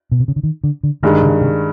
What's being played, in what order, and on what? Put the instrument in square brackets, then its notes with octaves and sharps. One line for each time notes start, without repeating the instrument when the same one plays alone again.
[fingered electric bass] B2
C3
C#3
D3
D#3
D3
D3
[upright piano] G2 D#3 G#3 [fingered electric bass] D3
[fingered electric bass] C#3
C3